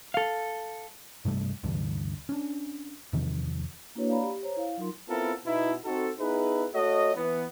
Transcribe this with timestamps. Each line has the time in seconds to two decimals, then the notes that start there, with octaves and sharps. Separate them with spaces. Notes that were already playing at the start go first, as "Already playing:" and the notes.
0.14 A4 F5
1.25 G2 C3 G3 A3
1.63 D2 G2 C3 E3
2.29 C#4 D4
3.13 E2 C3 D#3 F3
3.95 A#3 D4 E4 F#4 B4 C#5
4.08 D5 F5 A#5 B5
4.22 G4
4.42 C5 C#5 A#5
4.56 E4 F5
4.77 F#3 D#4 F4 A#4 C6
5.09 B3 C4 E4 F4 A4 A#4
5.45 B2 B3 D#4 E4
5.85 C4 D#4 F#4 A4
6.19 B3 D#4 E4 G#4 B4
6.74 A3 F#4 A4 C#5 D#5
7.16 E3 B3